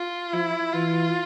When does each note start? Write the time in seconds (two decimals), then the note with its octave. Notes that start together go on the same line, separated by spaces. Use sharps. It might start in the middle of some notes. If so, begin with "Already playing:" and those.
Already playing: F4
0.33 F3 E4
0.74 E3 F4